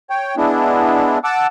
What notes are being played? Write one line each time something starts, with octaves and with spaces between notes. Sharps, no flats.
C#5 G5
G#3 B3 D4 E4
F#5 A5 D6 E6